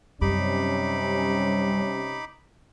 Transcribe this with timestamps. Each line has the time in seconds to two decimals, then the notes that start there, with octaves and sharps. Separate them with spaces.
0.21 F#2 C3 G3 C#4 D#4 B5 D6